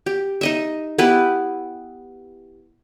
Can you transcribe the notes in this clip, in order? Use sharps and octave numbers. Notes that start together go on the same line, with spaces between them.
G4
D#4 D#5 E5
B3 E4 G4 B4